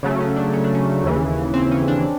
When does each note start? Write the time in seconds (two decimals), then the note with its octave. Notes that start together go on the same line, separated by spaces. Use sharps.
0.03 C#3 F#3 A3
0.20 C#4
0.36 D4
0.53 C#4
0.64 D4
0.74 C#4
1.04 D#2 C#3 E3
1.54 C4
1.71 C#4
1.88 D4